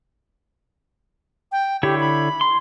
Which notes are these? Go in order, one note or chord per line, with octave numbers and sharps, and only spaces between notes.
G5
D3 E4 G4 C#5
B5
C6